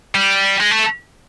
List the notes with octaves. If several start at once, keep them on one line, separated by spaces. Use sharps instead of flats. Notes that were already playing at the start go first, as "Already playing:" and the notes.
G3
G#3
A3